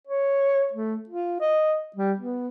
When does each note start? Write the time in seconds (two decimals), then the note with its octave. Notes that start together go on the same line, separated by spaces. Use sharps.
0.07 C#5
0.73 A3
1.09 F4
1.41 D#5
1.96 G3
2.19 B3